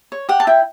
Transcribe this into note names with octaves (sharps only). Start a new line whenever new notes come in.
C#5
G4 F#5
A5
E4 G5